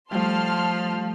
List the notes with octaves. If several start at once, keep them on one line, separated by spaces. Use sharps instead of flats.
F3 G3 A3 A5 C6 F6